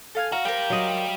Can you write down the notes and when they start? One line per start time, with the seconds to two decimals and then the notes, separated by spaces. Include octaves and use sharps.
0.15 A4 F5 G#5
0.32 F#4 F5 A#5
0.45 G3 G4 A#4 C5 G5
0.70 F#3 D#5